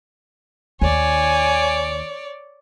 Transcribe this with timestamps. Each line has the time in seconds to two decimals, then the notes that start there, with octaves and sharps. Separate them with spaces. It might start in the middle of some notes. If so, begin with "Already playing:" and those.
0.81 D#2 D#3 C#5 D5 G#5